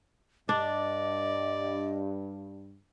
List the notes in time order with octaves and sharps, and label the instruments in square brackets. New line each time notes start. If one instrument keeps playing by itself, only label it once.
[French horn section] G2 [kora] D4 [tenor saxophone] D5 [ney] D#5